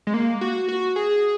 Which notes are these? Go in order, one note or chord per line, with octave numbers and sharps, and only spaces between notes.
G#3
A#3
F#4
F#4
G#4